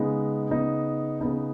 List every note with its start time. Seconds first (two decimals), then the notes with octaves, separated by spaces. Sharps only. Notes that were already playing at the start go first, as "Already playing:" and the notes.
Already playing: C#3 G#3 B3 D#4
0.50 C#3 B3 D#4
1.21 C#3 B3 D#4